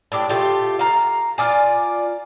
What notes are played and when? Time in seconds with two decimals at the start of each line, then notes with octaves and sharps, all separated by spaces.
0.12 A2 D4 G4
0.29 A3 F4 G4
0.79 F5 A#5
1.38 F4 D5 G#5